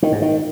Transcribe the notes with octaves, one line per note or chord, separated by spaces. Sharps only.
D#3
G#2
D#3